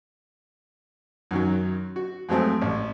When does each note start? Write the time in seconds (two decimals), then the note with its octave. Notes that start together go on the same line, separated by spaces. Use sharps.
1.31 F#2 D#3 F#3
1.96 F#4
2.29 F2 F#3 G#3 A3 C4
2.62 A1